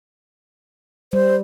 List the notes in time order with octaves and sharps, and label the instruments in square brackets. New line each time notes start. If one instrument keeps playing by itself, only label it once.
[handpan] G3 [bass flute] C5